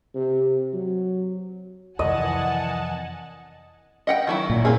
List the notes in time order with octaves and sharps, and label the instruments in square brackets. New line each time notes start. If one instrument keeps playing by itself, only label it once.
[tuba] C3
F#3
[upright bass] F2 C3 [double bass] D#3 E3 [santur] D#5 [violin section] F#5 G#5 A5
[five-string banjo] D#5 F#5 G5
D#3 F#3 E4
[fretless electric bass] A#2
[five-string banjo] A#3 C4 G#4